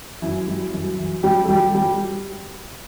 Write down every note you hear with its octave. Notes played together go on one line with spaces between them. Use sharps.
F#2 E4
G3
F#2
E3
F#2 G3 G4
A4
G3 G4
G3 G4